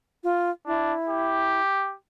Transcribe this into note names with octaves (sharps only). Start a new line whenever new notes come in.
F4
D4 E4
G4